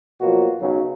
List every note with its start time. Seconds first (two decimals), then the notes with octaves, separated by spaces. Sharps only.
0.21 B2 F3 F#3 A#3 F4 F#4
0.61 B1 C#3 F#3